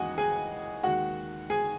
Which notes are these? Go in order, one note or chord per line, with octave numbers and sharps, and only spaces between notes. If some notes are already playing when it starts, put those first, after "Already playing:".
Already playing: D#2 C#3 E3 G#3 F#4 D#5 F#5 G#5
G#4 G#5
D#2 D#3 G#3 F#4 F#5
G#4 G#5